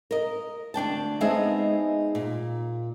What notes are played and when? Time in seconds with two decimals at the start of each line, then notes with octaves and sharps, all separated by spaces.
0.11 A#4 D#5
0.74 D2 D4 G5 A5
1.21 G#3 B3 C4 D#4 G#4 E5
2.15 A#2